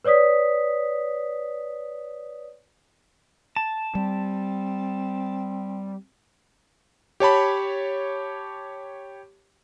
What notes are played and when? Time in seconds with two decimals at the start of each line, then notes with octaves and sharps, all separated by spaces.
0.05 B4 C#5 D5 D#6 B6
3.56 A5
3.95 G3 C4
7.20 G4 C#5 A5 B5